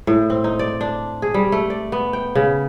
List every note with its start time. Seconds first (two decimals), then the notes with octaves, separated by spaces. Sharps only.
0.07 A2
0.30 C4
0.44 D#4
0.59 D5
0.81 D4
1.22 G#4
1.34 G3
1.52 A3
1.70 D5
1.92 B3
2.13 G5
2.35 C#3